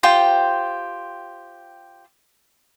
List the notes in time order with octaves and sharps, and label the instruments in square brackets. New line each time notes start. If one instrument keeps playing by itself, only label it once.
[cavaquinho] F4 G4 C5 G5